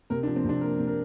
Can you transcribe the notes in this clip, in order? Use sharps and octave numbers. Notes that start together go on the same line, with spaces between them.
C3 A#4
D4
F3
C4
C3 D4
A#3 A#4
C3
A#4